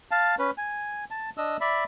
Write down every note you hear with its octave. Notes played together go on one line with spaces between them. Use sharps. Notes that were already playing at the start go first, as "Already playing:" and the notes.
F5 A5
C#4 B4
G#5
A5
D4 D#5 E6
D5 E5 B5